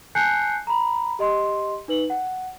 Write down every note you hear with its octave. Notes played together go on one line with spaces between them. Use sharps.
G#5 A5 F#6 G6 C7 C#7
A#5 B5
G4 D#5 C6
D#4 B4 F#7
F#5